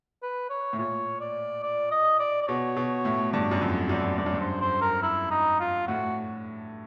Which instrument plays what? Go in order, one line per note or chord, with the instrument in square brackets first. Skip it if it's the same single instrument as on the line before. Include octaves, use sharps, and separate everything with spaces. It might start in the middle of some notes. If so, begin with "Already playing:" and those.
[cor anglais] B4
C#5
[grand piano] A2
[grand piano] A#2 [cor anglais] C#5
[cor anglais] D5
D5
D#5
D5
D5
[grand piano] B2 [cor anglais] C#5
[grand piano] B2
A2
[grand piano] G2 [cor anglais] D5
[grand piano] F#2
F2
[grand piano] F#2 [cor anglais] D5
[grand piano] G2 [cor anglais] D5
[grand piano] F#2
G2
[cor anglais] C5
C5
A#4
E4
D#4
F4
[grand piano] A2 [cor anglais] F#4